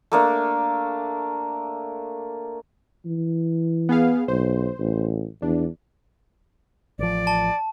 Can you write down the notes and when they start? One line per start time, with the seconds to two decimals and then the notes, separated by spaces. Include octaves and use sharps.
0.12 A3 A#3 D4
3.06 E3
3.89 B3 G#4 F5
4.28 B1 C5
4.79 A1
5.42 E2 D4
6.99 A1 F3 D5
7.27 A5